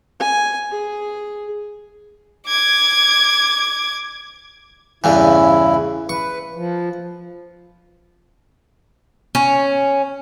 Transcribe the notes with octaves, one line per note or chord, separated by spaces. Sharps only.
G#5
G#4
D6 G#6
E2 G2 C#3 E3 E4
B4 C#6
F3
C#4